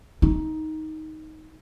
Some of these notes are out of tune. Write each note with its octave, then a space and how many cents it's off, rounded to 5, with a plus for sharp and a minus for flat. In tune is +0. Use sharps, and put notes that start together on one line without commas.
D#4 +10